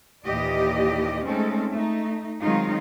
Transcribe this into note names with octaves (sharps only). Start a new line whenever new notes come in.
D#2 A#2 E3 G4 D5 D#5
G#3 A3 C4 C#4 D#4 A4
A3 D#4
D#3 F#3 G#3 C4 D#4 F4